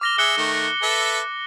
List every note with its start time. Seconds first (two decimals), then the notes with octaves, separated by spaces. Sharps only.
0.01 D6 F6 A#6 G7
0.18 G#4 E5 F#6 C#7 G7
0.37 D#3 A3
0.83 A4 B4 E5